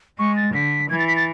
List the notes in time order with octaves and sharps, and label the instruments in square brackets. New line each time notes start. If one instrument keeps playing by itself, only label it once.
[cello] G#3 [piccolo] C#6
[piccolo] A6
[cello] D3 [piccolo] B6
[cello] E3 [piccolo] G#6
[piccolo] A6
B6
A6